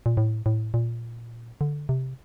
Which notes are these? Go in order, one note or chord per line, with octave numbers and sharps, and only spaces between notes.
A#2
A2
A2
A#2
D3
C3